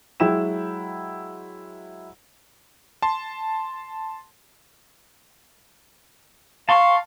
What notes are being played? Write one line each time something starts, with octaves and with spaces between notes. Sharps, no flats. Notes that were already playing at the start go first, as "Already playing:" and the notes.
F#3 G#3 E4 G5 E7
A5 C6
F5 A5 C6 C#6